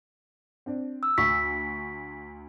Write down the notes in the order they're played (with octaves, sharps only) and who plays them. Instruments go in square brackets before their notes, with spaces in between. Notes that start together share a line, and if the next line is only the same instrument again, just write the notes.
[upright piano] C4 D4
[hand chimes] E6
[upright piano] D2 C#6 [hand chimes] B6